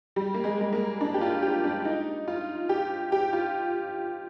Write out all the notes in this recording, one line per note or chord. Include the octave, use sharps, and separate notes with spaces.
G3
A#3
G#3
G#3
A#3
D4
G4
F4
G4
D4
D#4
F4
G4
G4
F4